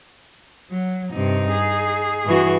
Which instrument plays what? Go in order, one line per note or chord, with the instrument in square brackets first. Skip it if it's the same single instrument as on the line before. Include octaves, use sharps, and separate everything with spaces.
[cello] F#3
[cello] G2 C3 [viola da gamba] D#4
[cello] G#4
[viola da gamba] G2 E3 F#4